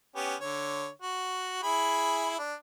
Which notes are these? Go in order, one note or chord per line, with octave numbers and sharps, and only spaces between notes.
B3 C#4 G4
D3 C#5
F#4
E4 G#4 B5
D4